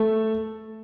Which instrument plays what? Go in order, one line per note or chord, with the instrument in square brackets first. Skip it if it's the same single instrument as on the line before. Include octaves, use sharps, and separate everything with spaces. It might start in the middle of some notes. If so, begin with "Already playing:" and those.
Already playing: [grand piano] A3 A4